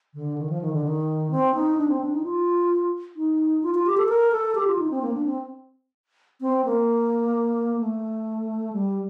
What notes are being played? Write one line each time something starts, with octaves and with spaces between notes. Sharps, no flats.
D3
D#3
F3
D#3
D3
D#3
C4
D#4
D4
C4
D4
D#4
F4
D#4
F4
F4
G4
A4
A#4
A4
G4
F4
D#4
C4
A#3
D4
C4
C4
A#3
A3
G3